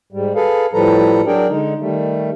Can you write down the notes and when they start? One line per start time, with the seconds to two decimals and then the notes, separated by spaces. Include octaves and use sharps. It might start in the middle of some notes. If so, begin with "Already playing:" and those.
0.13 G#2 G3
0.35 G#4 A4 B4 F5
0.74 A2 F3 G3 A4 B4 A#5
1.27 F#3 D4 G#4 A#4 D5 G5
1.49 D3 G#3 D#4
1.80 D#3 G3 A3